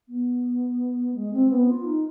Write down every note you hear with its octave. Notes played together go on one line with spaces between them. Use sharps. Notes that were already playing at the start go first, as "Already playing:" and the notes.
B3
G#3
C4
B3
F4
D#4